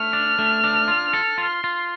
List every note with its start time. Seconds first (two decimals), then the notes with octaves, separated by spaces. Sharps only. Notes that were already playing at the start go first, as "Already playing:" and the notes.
Already playing: A3 F6
0.13 D4
0.39 A3
0.64 D4
0.88 F4
1.13 A4
1.38 F4 C6
1.64 F4